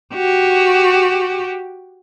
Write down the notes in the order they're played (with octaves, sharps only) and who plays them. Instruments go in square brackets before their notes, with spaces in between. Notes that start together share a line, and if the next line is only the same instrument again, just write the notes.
[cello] F#4 G4